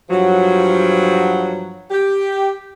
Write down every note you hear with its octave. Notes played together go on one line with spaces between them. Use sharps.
G2 F3 F#3
G4